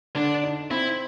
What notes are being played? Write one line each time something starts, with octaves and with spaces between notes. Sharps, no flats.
D3 D4
D#4
C4 E4